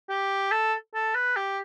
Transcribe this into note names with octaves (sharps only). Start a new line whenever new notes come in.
G4
A4
A4
B4
G4